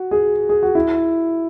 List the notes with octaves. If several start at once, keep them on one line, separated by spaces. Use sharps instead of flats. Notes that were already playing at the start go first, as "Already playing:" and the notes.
Already playing: F#4
G#4
G#4
F#4
E4